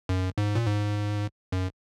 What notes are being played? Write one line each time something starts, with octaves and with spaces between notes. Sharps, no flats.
F#2
G#2
A#2
G#2
F#2